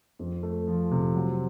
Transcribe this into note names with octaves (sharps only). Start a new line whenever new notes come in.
F2
A3
F3
C3
F#3